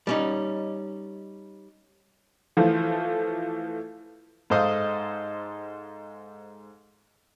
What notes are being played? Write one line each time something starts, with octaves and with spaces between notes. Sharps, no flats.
G3 C#4 D#4
E3 F3 A3 F4
G#2 A4 C5 D#5 F5 D#6